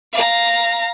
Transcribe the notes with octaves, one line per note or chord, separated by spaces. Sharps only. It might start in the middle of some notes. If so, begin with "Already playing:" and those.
F5 A#5